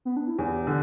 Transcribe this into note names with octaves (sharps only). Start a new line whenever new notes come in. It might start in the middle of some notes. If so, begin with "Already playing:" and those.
B3
D4
E4
E2 G4
D3